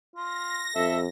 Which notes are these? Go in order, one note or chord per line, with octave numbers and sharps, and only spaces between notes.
F4 A#6
F2 A4 E5